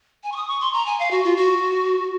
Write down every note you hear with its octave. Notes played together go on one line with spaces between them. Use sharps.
G#5
C#6
D#6
C#6
C6
A#5
G#5
F5
F#4
F4
F#4